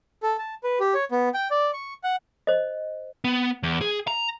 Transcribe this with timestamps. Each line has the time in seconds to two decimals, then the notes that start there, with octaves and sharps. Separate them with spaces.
0.23 A4
0.39 A5
0.64 B4
0.80 G4
0.94 C#5
1.11 B3
1.34 G5
1.51 D5
1.74 C#6
2.03 F#5
2.47 C5 D#5
3.24 B3
3.63 E2
3.81 G#4
4.07 A#5